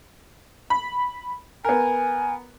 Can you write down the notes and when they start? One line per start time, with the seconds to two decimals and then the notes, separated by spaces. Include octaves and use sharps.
0.70 B5
1.65 B3 A#4 G#5